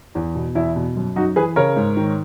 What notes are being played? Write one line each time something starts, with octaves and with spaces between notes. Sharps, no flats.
E2
B2
E2 E4
B2
F#2
F#2 D#4 F#4
E3 G#4 B4
C#3 A#4 C#5
G#2
D#3